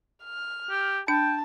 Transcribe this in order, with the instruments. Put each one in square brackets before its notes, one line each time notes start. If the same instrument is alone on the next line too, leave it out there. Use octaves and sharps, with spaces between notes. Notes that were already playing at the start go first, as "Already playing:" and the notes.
[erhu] F6
[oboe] G4
[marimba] D4 [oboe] G5 [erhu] A5